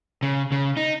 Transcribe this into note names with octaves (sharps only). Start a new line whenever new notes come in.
C#3
C#3
D#4